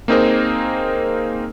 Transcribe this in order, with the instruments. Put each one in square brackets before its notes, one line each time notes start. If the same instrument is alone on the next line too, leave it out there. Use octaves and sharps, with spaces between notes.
[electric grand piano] A#3 C4 D#4 G#4 A#4 C5